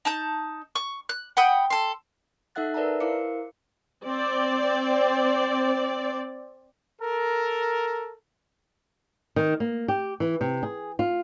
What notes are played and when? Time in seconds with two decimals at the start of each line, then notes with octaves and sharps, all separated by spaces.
0.05 D#4 A5 G6
0.75 C#6
1.09 F#6
1.37 F#5 G5 B5 D#6
1.70 A4 C6
2.55 D#4 A4 E5 F#5 F#6 A6
2.74 A#4 B4 D5 E5 A5 A#5
3.00 E4 A#4 C5 F5 D6 C#7
4.05 C4 D5
7.01 A4 A#4
9.36 D#3
9.60 A#3
9.88 G4
10.20 E3
10.41 C3
10.63 G#4
10.99 F4